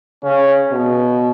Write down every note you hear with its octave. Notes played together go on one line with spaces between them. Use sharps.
C#3 C#4
B2